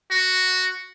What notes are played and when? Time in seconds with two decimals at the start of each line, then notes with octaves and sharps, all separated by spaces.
0.11 F#4